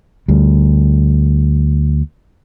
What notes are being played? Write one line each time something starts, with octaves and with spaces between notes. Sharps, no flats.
D2 G3